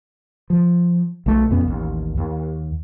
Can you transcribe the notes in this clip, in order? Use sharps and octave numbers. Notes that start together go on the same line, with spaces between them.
F3
B1 A3
F2 B2 B3 C#4
A1 D#2
D#2